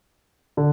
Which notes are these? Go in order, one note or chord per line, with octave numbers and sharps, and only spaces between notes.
D3